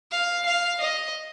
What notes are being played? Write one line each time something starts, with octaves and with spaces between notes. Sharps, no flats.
F5
F5
D#5